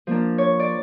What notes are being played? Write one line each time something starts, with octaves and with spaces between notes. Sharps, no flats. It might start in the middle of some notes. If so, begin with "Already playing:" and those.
F3 A#3 D4
C#5
D5